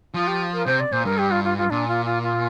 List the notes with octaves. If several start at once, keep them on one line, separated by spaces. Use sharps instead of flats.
F3 F4
G4
A#4
C3 C5
D5
A#2 C5
G2 A#4
G4
F4
F4
F4
A#2 D4
F4
F4
F4